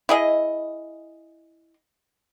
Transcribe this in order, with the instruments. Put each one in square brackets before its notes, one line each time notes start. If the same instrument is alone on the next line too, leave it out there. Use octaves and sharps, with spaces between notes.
[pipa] E4 G#4 D#5